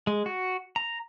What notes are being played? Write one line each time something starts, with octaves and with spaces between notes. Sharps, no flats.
G#3
F#4
A#5